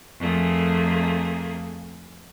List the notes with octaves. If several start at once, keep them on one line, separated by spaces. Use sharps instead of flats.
F2 A3 A#3 G#4